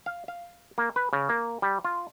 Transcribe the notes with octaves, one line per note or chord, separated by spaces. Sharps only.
F5
F5
A#3
B4
C#3
A#3
G3
F4